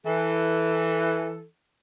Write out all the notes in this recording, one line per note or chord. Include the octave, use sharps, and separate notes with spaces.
E3 A4